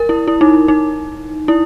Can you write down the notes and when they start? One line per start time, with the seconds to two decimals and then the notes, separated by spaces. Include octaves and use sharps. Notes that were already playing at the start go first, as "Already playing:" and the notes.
Already playing: A#4
0.09 E4
0.28 E4
0.41 D#4
0.68 D#4
1.48 E4